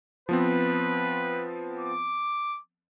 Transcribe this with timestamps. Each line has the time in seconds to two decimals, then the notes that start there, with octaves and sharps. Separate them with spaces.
0.29 F3 B3 C4 B4
1.80 D6